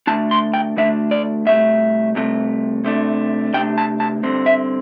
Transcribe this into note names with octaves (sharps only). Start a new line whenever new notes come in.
D2 D3 A3 D4 A5
C6
G5
D2 D3 A3 D4 E5
D5
C2 C3 A3 E5
C2 C3 A3
C3 A3 D4
C3 A3 D4 G5
A5
A5
G2 D3 C4
E5